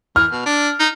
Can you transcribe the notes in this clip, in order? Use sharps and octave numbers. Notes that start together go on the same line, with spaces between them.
E3 F6
B2
D4
D#4